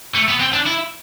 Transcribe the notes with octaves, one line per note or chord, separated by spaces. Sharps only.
A3
B3
C4
D4
E4